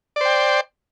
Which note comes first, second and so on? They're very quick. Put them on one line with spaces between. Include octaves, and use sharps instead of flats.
D5 C5 G5